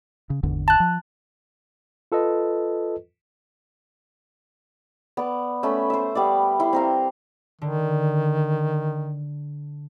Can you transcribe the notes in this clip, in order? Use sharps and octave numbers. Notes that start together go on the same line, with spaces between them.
C#3
G#1 E2 D3
A5 F#6
F3
F4 A4 B4 D#5
B3 D5
A3 C#4 B5
C5 E5
G3 B3 D5
E4 C6
C4 A#4 F5
D3 D#3